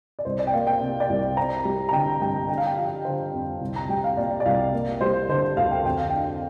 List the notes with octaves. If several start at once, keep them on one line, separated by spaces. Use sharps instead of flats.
D5
C2 C5
D5
G5
A#3 F5
G5
C3
D5
C2
C4 A#5
G3
A#5
D3 G5
G2 G5
D4 G5
F5
G5
F3 F5
D3 C5
F2
C2
A#5
G3 G5
F5
A#2 D5
D5
C2 F5
A#3
G3 C5
D3 C5
D2 F5
G5
F2 G5
F5
D4 G5